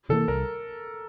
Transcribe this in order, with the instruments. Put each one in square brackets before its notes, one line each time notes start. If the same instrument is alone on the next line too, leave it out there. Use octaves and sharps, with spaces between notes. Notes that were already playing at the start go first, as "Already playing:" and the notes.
[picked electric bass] C3 E3 A#3 [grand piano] A4
[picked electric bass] C2 [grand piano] A#4